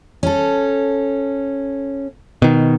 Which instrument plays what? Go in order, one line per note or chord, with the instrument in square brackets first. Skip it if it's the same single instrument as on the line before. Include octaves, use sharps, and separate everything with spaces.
[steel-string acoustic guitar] C#4 A4
[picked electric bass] B2 D#3